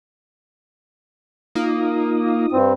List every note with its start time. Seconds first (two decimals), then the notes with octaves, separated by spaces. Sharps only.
1.55 A#3 D#4 F4 D#6
2.52 G2 C4